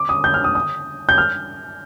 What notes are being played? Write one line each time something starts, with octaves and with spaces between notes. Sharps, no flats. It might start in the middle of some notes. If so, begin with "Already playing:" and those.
Already playing: D6
D#6
G6
F6
D#6
D#6
G6
F6